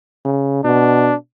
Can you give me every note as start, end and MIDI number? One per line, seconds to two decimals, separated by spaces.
0.25 0.62 49
0.64 1.13 47
0.64 1.15 62